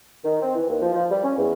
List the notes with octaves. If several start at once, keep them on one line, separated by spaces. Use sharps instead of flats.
D#3
C4
E3
D#2
F3
F3
G3
C#4
E2